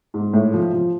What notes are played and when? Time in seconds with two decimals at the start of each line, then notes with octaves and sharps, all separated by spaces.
0.14 G#2
0.33 A2
0.54 F3
0.73 F3